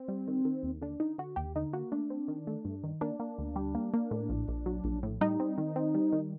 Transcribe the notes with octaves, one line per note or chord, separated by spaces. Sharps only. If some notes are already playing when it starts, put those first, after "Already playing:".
Already playing: C4
G3
D#3
D#3
D#2
D3 D4
D3 D#4
D3 F#4
D#2 G4
D3 D#4
A#3 F#4
A3 D4
C4
D#3
A3
G2
D#3
A#3 D4
A#3
D2
G3
A#3
A#3
A2
A#1
A#1
F#3
A#1
A2
G3 D#4
C4
D#3
C4
G3
D#3